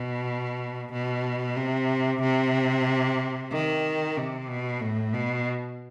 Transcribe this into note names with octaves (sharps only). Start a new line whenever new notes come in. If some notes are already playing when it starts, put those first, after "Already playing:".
Already playing: B2
B2
C3
C3
D#3
C3
B2
A2
B2